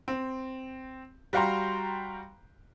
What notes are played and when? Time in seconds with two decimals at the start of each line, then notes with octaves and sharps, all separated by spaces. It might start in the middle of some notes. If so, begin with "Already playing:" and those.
0.08 C4
1.33 G3 F#4 F5 G5 A#5 C6